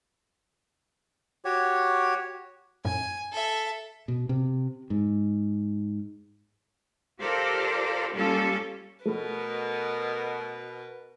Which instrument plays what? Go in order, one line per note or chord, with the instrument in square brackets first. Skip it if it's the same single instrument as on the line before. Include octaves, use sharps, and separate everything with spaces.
[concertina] F#4 G4 C#5
[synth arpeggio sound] F#2 A2 [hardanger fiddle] G#5
[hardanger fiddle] A4 E5
[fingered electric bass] B2
C3
G#2
[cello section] F4 G4 A4 A#4 C5 D5
G3 A#3 C#4 F4 G4 A4
[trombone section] B2 [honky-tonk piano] A3 [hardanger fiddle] A#4 B4